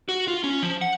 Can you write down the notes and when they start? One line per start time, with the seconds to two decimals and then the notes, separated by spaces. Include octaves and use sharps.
0.09 F#4
0.28 F4
0.44 C#4
0.62 F3
0.81 F#5